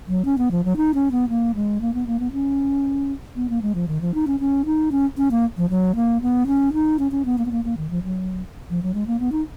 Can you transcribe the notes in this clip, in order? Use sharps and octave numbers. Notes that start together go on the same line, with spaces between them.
F#3
C#4
B3
F3
F#3
D#4
C#4
B3
A#3
G#3
A#3
B3
A#3
B3
C#4
B3
A#3
G#3
F3
D#3
F3
D#4
C#4
C#4
D#4
C#4
C#4
A#3
F3
F#3
A#3
B3
C#4
D#4
C#4
C#4
B3
A#3
B3
A#3
A#3
D#3
F3
F#3
F3
F#3
G#3
A#3
B3
D#4